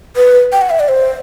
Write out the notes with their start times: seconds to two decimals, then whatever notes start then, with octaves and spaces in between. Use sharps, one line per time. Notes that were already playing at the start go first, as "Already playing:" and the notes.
0.16 B4
0.52 G5
0.61 F#5
0.70 E5
0.80 D5
0.88 C5